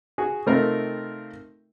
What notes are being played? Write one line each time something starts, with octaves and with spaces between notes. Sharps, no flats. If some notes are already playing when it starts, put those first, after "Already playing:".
F#4 G#4
C3 A3 C4 D#4 F4 A#4